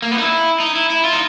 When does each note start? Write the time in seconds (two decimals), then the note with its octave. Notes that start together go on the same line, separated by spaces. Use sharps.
0.02 A#3
0.12 B3
0.18 D#4
0.22 E4
0.60 D#4
0.76 E4
0.90 E4
1.04 F4
1.13 D#4